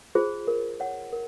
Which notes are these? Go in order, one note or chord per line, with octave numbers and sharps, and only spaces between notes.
F4 G#4 C5
A#4
C#5 F#5
A#4